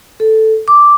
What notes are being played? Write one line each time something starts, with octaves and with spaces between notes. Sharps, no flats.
A4
D6